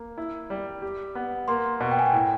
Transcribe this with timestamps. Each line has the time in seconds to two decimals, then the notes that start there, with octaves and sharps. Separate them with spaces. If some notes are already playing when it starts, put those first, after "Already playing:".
Already playing: A#3
0.18 E4
0.50 G3
0.82 G4
1.15 B3
1.48 A#3 C6
1.80 B2
1.91 G5
1.99 G#5
2.06 G5
2.13 A2